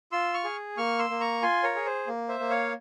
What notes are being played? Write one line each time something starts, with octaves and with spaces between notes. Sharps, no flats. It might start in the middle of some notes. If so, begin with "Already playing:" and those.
F4 C6 E6
C#6 F6
G#4
A#3 C#6 F6
C6 E6
A#3
A#5 C#6
F4 G#5 C6
A#4 C#5
G#4
C5
A#3
C5 E5
A#3
C#5 F5